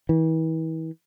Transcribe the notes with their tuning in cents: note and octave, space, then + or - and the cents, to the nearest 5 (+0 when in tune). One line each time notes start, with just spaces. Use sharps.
E3 -40